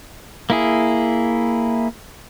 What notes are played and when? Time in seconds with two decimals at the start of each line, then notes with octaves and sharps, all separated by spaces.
0.50 A#3 E4 G#4